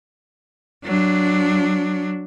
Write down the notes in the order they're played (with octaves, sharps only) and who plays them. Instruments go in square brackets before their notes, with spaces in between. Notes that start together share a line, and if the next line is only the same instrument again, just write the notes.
[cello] F#3 D4